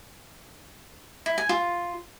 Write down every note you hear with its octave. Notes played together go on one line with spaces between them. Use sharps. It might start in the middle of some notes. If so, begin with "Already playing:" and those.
E4
G#5
F4